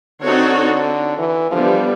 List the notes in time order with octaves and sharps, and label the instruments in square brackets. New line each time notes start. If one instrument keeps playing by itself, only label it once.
[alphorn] D3 [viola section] C4 D#4 F#4 A4 C#5
[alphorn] E3
[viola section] D3 G3 B3 [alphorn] F3